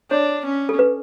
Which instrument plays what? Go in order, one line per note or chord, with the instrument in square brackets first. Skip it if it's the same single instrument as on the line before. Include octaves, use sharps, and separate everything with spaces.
[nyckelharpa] D4 [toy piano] C#5
[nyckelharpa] C#4
[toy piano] A4
B4